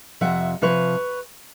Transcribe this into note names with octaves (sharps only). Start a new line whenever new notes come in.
F2 C3 F3 E5 F#5
C3 F3 B4 C#5